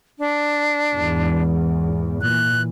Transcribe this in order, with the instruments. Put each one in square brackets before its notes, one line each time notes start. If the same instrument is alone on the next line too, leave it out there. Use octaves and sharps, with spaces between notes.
[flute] D4
[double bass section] E2 G#2
[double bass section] A#2 E3 [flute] F#6